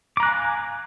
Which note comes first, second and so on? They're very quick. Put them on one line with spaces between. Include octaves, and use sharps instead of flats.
D6 A#5 F#6 G#5 F5